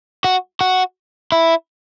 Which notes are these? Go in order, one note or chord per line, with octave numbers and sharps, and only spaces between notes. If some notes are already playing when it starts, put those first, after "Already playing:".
F#4
F#4
E4